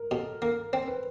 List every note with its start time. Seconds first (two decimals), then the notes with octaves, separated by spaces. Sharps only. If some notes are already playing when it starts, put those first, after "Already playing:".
Already playing: A#4
0.11 B2 A4
0.42 A#3 A#4
0.73 C4 C5
0.88 B4